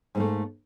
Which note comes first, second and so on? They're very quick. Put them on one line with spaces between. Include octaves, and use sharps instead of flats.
G#2 A#3 A3